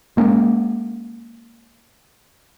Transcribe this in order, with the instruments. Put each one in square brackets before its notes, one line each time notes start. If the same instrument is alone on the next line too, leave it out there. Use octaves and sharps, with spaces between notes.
[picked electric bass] G#3 A#3 C#4